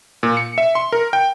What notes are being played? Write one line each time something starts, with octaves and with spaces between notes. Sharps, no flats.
A#2
C#7
E5
C6
A#4
G5